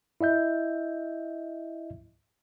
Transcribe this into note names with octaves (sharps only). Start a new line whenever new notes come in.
E4 D#5 E5 G6